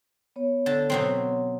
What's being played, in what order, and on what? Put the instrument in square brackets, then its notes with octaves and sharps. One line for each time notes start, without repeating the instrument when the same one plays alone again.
[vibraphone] B3 C#5
[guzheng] D3 A5
B2 F#3 C4